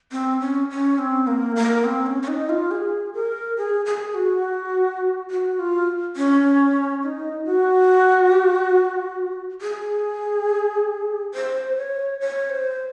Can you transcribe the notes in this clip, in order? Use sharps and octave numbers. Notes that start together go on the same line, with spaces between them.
C4
C#4
C#4
C4
A#3
A#3
C4
C#4
C#4
D#4
F4
G#4
A#4
G#4
G#4
F#4
F#4
F4
C#4
D#4
F#4
G#4
C5
C#5
C#5
C5